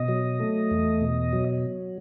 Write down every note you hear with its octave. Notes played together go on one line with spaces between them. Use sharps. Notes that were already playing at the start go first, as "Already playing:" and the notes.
Already playing: B2 D#5
F#3
A3
E2
B2
F#3